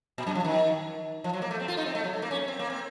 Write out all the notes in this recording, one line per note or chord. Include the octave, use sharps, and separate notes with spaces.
A#2
F#2
F3
D#3
F3
F#3
A#3
A3
C4
F4
D#4
C4
A3
F#3
A3
A#3
C#4
C4
A#3
C4